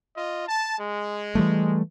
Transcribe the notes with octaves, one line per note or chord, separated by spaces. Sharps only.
F4 D#5
A5
G#3
E3 G3 A3